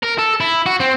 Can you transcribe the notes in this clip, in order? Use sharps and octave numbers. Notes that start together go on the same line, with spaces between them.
A#4
A4
E4
F#4
C4